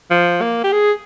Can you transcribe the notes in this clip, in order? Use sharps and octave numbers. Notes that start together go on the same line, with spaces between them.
F3
A#3
G4
G#4